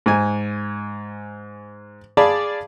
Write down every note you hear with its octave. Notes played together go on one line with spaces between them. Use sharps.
G#2 G#5
G#4 D5 F5 A5 B5